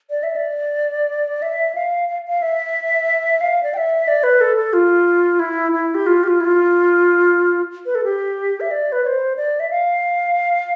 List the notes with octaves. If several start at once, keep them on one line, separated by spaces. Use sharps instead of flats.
D5
E5
D5
E5
F5
F5
F5
E5
F5
D5
G5
E5
D5
B4
A4
A4
F4
E4
E4
G4
F4
G4
F4
E4
F4
B4
A4
G4
E5
D5
B4
D5
C5
D5
E5
F5